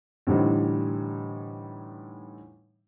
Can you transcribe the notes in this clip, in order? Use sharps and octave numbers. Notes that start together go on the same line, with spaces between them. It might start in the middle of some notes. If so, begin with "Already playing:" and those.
A2 D3 E3 G3 C4 D#4